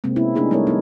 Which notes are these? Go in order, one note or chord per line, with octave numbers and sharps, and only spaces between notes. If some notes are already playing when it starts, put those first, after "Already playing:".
C3 G#3 A#3 C4
B3 C#4 E4
G#3 A3 D4 D#4 G#4
G3 A3 B3 E4 A#4 C#5
F3 B3 D#4